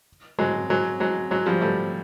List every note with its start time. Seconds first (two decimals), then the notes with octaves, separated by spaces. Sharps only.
0.39 F#3 G#3
0.70 F#3 G#3
1.00 F#3 G#3
1.31 F#3 G#3
1.46 F3 G3
1.61 G3 A3